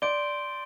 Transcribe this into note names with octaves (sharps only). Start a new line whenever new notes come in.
D5 C6 G6 D7 G7